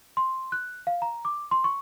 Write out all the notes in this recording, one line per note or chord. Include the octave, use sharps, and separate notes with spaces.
C6
F#6
F5
A#5
D6
C6
C#6